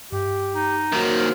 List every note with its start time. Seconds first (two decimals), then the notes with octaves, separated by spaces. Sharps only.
0.12 G2 G4
0.54 D#4
0.93 A#2 D#3 F#3 F#4 C5
1.17 F5